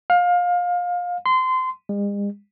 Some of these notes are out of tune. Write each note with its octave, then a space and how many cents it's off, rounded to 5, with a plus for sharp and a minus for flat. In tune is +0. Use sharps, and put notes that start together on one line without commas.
F5 +25
C6 -25
G#3 -45